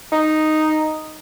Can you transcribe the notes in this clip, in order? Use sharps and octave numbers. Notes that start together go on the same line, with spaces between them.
D#4